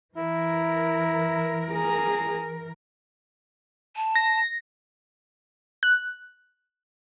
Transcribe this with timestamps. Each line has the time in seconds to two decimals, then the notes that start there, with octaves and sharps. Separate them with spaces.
0.17 E3 E4 A#4
1.72 G#4 A#5
3.96 A5
4.16 A#6
5.83 F#6